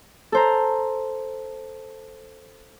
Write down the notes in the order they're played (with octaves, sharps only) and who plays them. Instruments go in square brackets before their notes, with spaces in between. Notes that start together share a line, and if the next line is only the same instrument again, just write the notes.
[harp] A4 C5 A#5